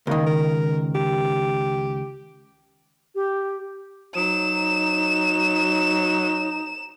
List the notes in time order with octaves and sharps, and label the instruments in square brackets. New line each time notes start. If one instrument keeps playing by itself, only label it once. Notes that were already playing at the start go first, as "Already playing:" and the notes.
[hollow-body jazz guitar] C#2 D#3 [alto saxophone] A#3
[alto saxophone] A#4
G4
[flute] G4
[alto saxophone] F#3 [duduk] D#4 [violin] E7